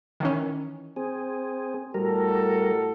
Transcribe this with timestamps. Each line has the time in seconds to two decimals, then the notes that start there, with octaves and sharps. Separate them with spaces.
0.20 D#3 E3 C#4
0.96 C4 G#4
1.94 A2 G3 F#4 A4 A#4